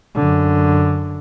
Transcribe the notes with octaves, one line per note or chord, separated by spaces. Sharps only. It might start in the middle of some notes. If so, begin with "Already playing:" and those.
F#2 D3